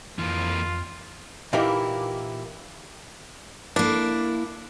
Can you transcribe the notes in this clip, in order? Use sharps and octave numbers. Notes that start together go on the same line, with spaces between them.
F2 E3 A#3 F4
A#2 E3 A#3 D#4 E4 G4
A#3 D4 E4